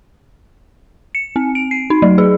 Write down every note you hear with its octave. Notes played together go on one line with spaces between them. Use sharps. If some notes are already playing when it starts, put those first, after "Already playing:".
C#7
C4
D7
C7
D#4
F#3
G#4